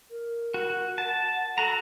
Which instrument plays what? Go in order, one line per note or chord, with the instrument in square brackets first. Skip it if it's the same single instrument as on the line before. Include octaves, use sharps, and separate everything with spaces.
[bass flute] A#4
[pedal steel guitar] F#4
[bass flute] F#5 [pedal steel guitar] A5
[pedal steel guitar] F#4 A#5 [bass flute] A4